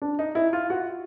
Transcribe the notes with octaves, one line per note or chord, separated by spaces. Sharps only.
D4
D#4
E4
F4
F#4